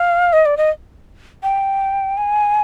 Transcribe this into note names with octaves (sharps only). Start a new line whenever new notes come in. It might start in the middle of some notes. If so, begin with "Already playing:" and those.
Already playing: F5
D#5
D5
D#5
G5
G#5